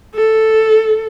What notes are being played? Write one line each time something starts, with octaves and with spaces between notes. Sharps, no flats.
A4